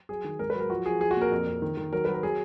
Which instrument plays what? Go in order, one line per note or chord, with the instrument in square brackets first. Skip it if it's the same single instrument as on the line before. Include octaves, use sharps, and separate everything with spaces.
[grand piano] F#3 G#4
D#3
G#2 A#4
B4
F#3
A#4
F3 F#4
F3 G#4
F3 G#4
F#4
A#2 A#4
F2
F2
D#3
D#3
F#3 A#4
F#3 B4
A#4
F#3 G#4